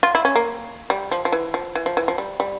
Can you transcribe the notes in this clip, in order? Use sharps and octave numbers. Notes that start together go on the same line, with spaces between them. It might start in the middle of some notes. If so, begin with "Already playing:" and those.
F4
E4
C#4
A#3
G3
F3
F3
E3
F3
E3
F3
E3
F3
G3
G3